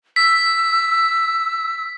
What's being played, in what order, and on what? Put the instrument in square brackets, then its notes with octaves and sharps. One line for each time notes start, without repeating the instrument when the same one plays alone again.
[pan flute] E6 [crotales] B6